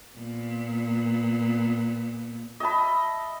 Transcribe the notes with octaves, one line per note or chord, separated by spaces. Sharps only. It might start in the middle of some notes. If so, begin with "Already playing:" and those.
A#2 B3
D#5 E5 A5 B5